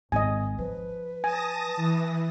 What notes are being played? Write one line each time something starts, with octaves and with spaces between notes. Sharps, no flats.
G#1 D#5 G#5
F3 B4
G#5 A5 D#6 A#6
E3